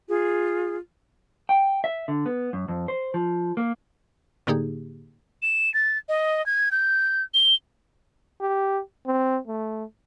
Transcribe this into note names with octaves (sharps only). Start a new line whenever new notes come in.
F4 G#4
G5
E5
D3
B3
F#2
F2
C5
F3
A#3
A2 D3 A#3 D#4 G4 G#4
E7
A6
D#5
G#6
G6
G7
G4
C4
A3